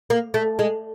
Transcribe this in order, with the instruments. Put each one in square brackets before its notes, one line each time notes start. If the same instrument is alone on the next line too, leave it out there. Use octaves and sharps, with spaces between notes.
[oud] A#3
A3
G#3